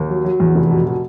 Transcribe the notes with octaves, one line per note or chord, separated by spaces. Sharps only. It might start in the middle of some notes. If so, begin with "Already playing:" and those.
Already playing: D#2
F#3
F#3
E2
F1
B2
B2